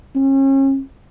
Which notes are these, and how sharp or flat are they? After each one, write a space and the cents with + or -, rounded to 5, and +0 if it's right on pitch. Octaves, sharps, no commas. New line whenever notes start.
C#4 -35